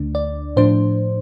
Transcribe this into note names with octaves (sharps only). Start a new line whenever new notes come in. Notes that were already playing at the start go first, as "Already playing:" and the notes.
Already playing: D2 D3 A3 D4
D5
A2 F3 D4 C5